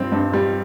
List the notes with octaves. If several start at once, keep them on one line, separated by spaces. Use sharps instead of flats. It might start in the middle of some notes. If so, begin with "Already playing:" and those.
Already playing: G2 C4
G2
G3